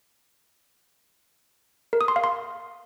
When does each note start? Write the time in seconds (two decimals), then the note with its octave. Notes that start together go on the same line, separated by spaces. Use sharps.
1.93 A#4
2.01 D#6
2.08 C6
2.16 F5
2.24 C6